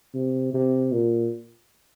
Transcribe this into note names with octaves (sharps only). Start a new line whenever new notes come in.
C3
C3
A#2